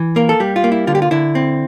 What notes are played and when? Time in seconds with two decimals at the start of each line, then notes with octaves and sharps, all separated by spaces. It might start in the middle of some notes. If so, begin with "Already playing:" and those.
Already playing: E3
0.16 A#3 A#4
0.29 A4
0.40 G3 G4
0.56 F4
0.64 A#3
0.72 E4
0.87 D3 F4
0.95 G4
1.02 F4
1.11 D3 E4
1.35 C4